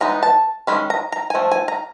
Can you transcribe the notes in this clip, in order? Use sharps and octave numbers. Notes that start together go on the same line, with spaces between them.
E3 G#3 B3 D#4 A#5
A5
D#3 G#3 C#4 B5
A#5
A#5
G#5
F3 A3
G#5
A#5